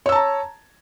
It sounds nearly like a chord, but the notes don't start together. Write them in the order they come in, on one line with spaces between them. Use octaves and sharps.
C#5 E6 A5 A#5